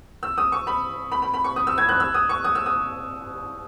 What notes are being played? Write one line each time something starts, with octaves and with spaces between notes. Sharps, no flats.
E6
D#6
C#6
B5
B5
B5
B5
C#6
D#6
E6
G#6
F#6
E6
D#6
C#6
D#6
E6
D#6